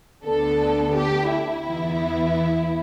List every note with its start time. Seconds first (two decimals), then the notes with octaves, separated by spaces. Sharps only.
0.25 D2 D3 B3 D4 A4
0.96 G4
1.30 E4
1.65 E2 E3 B3